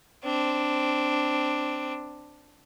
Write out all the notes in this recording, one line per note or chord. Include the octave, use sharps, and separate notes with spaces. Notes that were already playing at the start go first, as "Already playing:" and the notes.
C4 D4